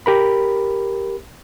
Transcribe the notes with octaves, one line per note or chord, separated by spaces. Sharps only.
G4 A#4 B5